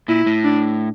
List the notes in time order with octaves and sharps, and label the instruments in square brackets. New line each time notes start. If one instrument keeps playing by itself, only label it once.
[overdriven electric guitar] A#2 [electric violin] E4
[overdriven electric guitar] A2
[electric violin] D4